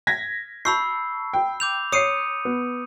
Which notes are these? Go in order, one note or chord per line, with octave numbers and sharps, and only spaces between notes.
G#6 A#6 B6
A5 B5 C#6 E6 G6 C7
G5
D6 G6 F7
C#5 D#6 C7 C#7 D#7
B3